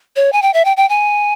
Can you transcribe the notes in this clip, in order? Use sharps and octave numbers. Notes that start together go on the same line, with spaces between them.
C#5
G#5
G5
E5
G5
G5
G#5